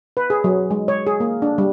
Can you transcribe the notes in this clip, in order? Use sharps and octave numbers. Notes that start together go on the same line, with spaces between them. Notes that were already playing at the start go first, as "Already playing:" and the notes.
B4
G#4
F#3
G#3
C#5
G#4
A#3
D4
G3